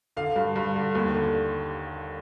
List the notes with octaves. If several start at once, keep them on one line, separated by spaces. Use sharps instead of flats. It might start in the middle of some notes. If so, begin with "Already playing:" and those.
D3 F5
G2
G2
D3
D#2
D3